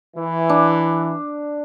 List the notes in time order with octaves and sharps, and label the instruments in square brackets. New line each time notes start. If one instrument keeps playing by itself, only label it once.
[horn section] E3
[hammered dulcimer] D4